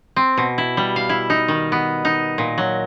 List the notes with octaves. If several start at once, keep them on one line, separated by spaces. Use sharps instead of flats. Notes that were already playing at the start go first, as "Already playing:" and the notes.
C4
B2
E4
G3
F5
E4
D#4
D#3
B3
D#4
A#2
F#3